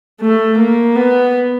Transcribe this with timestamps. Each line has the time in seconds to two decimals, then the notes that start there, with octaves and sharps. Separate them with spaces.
0.21 A3
0.58 A#3
0.95 B3